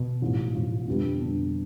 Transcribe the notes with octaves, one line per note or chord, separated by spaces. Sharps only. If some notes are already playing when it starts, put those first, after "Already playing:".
Already playing: B2
A1 G#2 F3
A1 G#2 F3
F2 D3 G3 B3 D4
F2 D3 G3 B3 D4